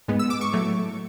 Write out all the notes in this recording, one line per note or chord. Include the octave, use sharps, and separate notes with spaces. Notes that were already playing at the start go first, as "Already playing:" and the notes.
G#2 G#3 B3
E6
D6
C#6
A2 F#3 A3